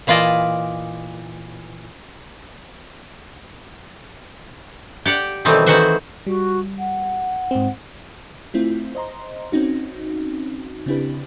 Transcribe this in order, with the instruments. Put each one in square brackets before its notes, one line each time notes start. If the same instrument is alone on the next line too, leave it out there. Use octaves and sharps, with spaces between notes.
[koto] A#2 E3 F4 D5 D#5 A5
G4 D5 F#5
B2 D#3 E3 G3 A3 C4
D#3 E3 F#4 C5 E5
[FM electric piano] G3 [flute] F#4
[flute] F#5
[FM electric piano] G#2 C4
A3 C4 E4 F4
C5 D#5 A#5 C6
C4 C#4 D#4 F#4
C#3 C4 D4 E4 G4 B4